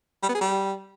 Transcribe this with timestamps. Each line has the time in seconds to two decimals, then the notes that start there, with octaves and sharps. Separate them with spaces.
0.23 G3
0.29 B3
0.35 G#4
0.41 G3